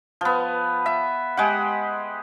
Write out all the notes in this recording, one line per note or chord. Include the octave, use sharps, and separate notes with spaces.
F3 B3
E5
G#3 G4 F#5